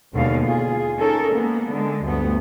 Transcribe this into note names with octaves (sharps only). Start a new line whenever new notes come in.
D#2 B2 D3 G#3 F5
F4 G#4
C#4 D#4 A4 A#4
G#3 A#3 B3
D3 G#3
D2 G2 A3 B3